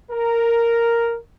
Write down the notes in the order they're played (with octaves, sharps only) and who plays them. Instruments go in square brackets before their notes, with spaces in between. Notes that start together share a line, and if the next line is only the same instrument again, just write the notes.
[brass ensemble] A#4